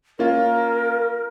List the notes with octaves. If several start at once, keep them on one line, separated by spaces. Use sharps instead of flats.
A#3 C#4 F4 A#4